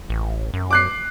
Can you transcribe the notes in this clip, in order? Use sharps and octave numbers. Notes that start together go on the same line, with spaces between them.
A1
F#2
D6 F#6 C7